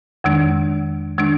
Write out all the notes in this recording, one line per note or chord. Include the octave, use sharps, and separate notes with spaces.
F2 D#3 G#3 D4
D#3 G#3 D4